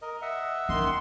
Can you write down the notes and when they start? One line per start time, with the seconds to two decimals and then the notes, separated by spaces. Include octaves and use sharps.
0.02 A#4 D#5
0.22 D#5 E5 F#5
0.69 D#3 C#4 C6